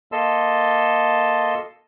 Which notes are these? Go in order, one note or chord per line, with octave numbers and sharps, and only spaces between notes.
A#3 A4 D#5 A5 C6 E6